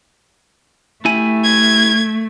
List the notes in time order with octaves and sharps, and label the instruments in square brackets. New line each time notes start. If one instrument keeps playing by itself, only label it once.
[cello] A3 [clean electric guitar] E4 G4 G#5
[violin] G#6